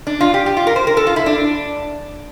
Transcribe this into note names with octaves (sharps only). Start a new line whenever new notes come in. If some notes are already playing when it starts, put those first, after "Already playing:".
D4
F4
G4
G4
F4
A#4
C5
A#4
A4
F4
E4
D4